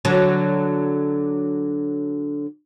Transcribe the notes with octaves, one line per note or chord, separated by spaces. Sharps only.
D3 F#3